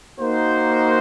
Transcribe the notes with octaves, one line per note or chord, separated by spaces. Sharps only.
A#3 D#4 F#4 C5